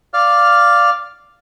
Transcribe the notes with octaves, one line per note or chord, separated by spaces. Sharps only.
D5 F5 F6